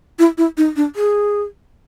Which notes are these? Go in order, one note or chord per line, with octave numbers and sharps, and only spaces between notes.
E4
E4
D#4
D4
G#4